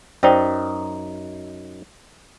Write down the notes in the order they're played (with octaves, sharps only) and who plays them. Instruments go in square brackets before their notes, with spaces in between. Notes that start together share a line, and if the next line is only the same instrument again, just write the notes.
[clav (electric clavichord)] F#2 D#4 [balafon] C5 D5 G5